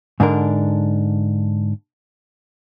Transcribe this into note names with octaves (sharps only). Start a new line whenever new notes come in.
G#2 D3 D4 A#4